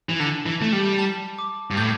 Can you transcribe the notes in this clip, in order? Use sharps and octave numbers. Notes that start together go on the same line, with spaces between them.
E3
D3 A5
E3
A3 A5
G3
A5
D6
G2
A2 G6